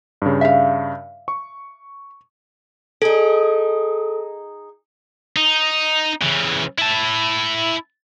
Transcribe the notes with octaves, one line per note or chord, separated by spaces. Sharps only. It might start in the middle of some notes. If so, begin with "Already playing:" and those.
G2 C#3
E5 F5
C#6
D#4 G#4 A4
D#4
C#3 E3
E4 A5